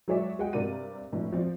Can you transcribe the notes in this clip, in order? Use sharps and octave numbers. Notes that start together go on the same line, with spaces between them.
F#3 G#3 G#4 C#5 D5 E5
G#4 D#5 F#5 G5
G2 C3 G3 A#4 D5 D#7
F1 A2 D4
F3 C4 D5